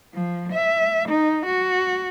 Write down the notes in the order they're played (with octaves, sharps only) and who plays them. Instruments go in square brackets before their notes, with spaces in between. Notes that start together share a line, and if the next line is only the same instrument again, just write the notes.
[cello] F3
E5
D#4
F#4